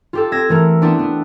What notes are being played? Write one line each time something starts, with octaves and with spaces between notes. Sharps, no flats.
F4 G4 A4
C4 E6 G#6 A#6
E3 A3 A#4
B3 C4 D4 E4
B3